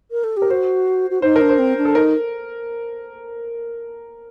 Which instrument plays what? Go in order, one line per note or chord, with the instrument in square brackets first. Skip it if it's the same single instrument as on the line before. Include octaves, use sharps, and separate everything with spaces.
[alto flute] A#4
A4
G4
[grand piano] A#4
[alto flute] F#4 [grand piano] C5
[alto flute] F#4
[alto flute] D#4 [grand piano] C5
[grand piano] A#4
[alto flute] D4
[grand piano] C5
[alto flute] C4
D4
[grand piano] A4
[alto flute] D#4 [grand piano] A#4